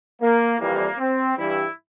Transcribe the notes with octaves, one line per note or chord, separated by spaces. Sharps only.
A#3
F2 E3 G3 A#3
C4
G2 E3 G3 E4